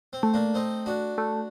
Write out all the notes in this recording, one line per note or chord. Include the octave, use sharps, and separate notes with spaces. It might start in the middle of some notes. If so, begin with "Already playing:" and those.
C4
A3
A#3 D4
C4 D#4
D4 F#4
A3